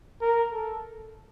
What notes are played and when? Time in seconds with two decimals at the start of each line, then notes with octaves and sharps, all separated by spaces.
0.21 A#4
0.53 A4